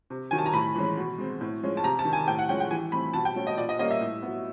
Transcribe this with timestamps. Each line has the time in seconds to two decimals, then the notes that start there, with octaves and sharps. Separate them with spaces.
0.10 C3
0.31 D#3 F#3 G#5
0.38 A5
0.46 A#5
0.53 A2 B5
0.75 E3 G#3 C#4
0.97 B2
1.18 G#3 C4
1.41 A2
1.63 F3 G#3 C#4
1.77 A5
1.84 C3 A#5
1.99 A5
2.05 D#3
2.10 G3 G#5
2.28 A2 G5
2.39 F#5
2.49 F3 G#3 C#4 G5
2.60 G5
2.71 E3 G#5
2.92 A3 C4 B5
3.14 B2 A5
3.25 G5
3.36 F#3 A3 C#4
3.47 D#5
3.57 A#2 D5
3.69 D#5
3.79 G3 A#3 C#4 D#5
3.91 E5
4.01 A2
4.23 F#3 B3